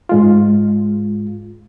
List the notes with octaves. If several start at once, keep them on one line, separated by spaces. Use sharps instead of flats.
G#2 G#3 F4